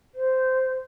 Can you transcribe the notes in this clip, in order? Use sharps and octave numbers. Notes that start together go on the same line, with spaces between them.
C5